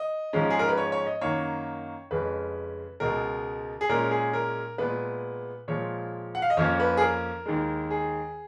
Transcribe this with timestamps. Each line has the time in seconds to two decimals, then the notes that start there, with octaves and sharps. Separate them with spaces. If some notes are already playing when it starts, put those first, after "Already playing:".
Already playing: D#5
0.33 G#2 F3 G#3 C#4
0.50 G#4
0.59 A#4
0.69 B4
0.77 C#5
0.92 C#5
1.06 D#5
1.21 F#2 D#3 A#3 C#5
2.11 F2 C#3 G#3 C#4 B4
3.00 C#2 B2 G#3 A#4
3.81 G#4
3.89 A#2 G#3 C#4 A#4
4.11 G#4
4.33 A#4
4.78 A#2 G#3 B3 B4
5.68 A#2 F3 G#3 C#5
6.35 F#5
6.42 F5
6.50 D#5
6.57 F2 F3 A#3 C#4 C#5
6.80 B4
6.97 G#4
7.01 A#4
7.46 D#2 D#3 G#3
7.91 G#4